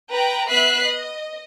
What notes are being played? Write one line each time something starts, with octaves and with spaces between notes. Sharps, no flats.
B4 G5 A#5
B3 B4 E5 F#6 B6 C7
D#5